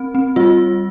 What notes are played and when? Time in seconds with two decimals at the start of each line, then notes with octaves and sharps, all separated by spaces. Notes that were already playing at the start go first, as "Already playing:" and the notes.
Already playing: C4
0.15 C4
0.36 G3 F4